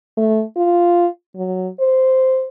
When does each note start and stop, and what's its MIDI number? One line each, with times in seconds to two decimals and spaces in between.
0.17 0.43 57
0.57 1.07 65
1.36 1.68 54
1.80 2.48 72